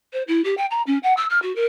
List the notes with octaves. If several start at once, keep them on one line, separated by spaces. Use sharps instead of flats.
C5
E4
G4
G5
A#5
C#4
F#5
E6
F6
F#4
A#4